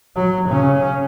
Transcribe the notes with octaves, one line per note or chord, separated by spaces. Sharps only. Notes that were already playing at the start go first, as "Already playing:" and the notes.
F#3
C#3 C#4